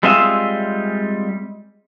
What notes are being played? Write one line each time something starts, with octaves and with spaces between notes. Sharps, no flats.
G3 G#3 C4 F4 G#4 E5